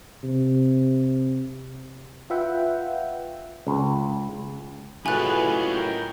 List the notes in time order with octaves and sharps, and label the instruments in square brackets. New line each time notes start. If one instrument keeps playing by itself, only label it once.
[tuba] C3
[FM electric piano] F4 B4 E5 F#5 G5
[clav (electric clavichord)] C#2
[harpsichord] F#2 A2 [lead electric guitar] C#4 F4 [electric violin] G#4 B4 [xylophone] G#5 F#6
[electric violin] A#4 G5